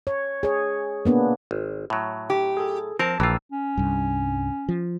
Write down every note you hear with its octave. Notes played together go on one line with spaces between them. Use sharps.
C#5
G#4 C#5
A#3 B3 D4
G#1
A2 F#3
G4
G#4 A4
F3 C4 F4 A#4 A5
A#1 E3 F4 G5 A#5 E6
C#4
C2 G2
F3